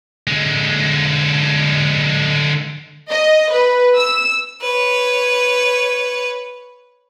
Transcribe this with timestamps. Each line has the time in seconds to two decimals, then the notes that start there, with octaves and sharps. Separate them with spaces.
0.27 D3 G#3
3.10 D#5
3.52 B4
3.98 E6
4.61 B4 C#5